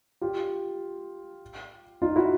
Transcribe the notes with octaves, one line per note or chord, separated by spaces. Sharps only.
F4 G4
D#4 F4
E4 F#4